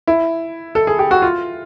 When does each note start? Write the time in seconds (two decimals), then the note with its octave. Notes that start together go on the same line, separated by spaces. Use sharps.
0.07 E4
0.75 A4
0.87 G#4
0.99 G4
1.11 F#4
1.22 F4